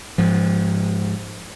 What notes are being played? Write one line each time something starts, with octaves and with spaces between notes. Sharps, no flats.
G#2 F3